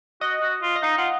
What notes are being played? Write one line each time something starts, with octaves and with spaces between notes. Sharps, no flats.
F#4 D#5
F#4
F4
D#5
D#4 F5
F4 F#5